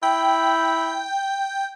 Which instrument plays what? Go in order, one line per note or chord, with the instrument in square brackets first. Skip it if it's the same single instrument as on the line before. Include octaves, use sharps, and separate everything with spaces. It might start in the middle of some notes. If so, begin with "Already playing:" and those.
[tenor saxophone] E4 [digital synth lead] G5